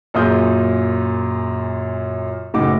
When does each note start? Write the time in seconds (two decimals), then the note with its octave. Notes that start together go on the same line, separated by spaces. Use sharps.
0.14 F#2 A#2 F4 G#4 D#6 G6
2.54 F#1 A2 D#4 F#4 D6